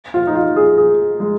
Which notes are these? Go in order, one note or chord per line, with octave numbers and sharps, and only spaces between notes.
F4
D#4
F4
G#4
G#4
G#3